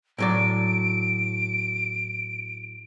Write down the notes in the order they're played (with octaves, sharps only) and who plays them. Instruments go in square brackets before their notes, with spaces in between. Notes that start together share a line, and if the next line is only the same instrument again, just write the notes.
[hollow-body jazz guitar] A2 F#3 D5 [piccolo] D7